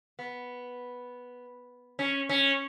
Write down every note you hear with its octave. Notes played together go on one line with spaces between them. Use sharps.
B3
C#4
C#4